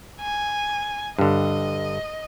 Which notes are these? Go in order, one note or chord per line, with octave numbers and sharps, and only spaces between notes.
G#5
G2 D3 D#5